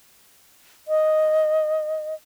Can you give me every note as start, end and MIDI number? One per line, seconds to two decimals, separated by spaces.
0.88 2.15 75